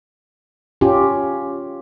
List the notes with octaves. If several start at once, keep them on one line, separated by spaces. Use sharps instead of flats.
C#4 F4 G4